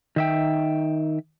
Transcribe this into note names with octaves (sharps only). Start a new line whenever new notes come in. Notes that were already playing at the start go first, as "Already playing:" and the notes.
D#3 E5 G5